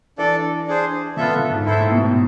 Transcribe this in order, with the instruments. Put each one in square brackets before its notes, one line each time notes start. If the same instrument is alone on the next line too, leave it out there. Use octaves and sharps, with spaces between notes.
[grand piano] E3 [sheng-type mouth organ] D4 A4 D5
[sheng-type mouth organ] D4 G#4 C5
[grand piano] D3 [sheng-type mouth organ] B3 F4 A4 E5
[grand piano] D3
G#2
[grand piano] G#2 [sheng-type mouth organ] E4 A4 C5 E5
[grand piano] A2
B2
A2